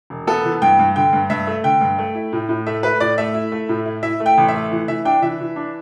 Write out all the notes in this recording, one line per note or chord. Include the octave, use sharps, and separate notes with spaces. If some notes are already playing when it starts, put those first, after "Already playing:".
E1
B3 A4
E3
G2 G5
G2
D3 G5
G2
G2 E5
A3
D3 G5
G2
A3
E4
A2
A2
A3 E5
A3 B4
A2 D5
A3 E5
E4
A3
A2
E4
E4 E5
A3
G5
A1
E5
A3
E3
E3 E5
D4 G5
E3 E5
E3
D4